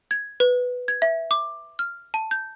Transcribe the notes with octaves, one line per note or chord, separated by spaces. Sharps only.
G#6
B4
G#6
E5
D6
F6
A5
G6